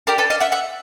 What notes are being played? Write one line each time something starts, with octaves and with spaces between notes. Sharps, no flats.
D4 G4 A#4
A4 B4
D#5 F5
E5 F#5
E5 F#5